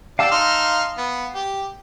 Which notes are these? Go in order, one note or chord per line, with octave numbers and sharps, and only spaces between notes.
G4 D5 F5 A5 E6
D#4 C6 F6
B3
G4